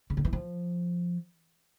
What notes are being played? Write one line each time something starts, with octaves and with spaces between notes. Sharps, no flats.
C#3
D3
E3
F3